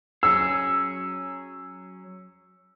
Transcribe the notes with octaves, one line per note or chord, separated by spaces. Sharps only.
F#3 C#4 G#4 E6